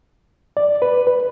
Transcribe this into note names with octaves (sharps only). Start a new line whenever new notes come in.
D5
B4
B4